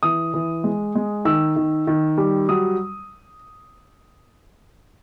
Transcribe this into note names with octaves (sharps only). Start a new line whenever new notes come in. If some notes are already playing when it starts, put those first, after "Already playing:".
E3 D#6
E3
G#3
G#3
D#3 E6
D#3
D#3
G3
F#3 D#6